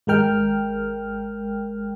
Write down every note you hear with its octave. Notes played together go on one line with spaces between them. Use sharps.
G#1 G#2 G#3 A#4 G5 F6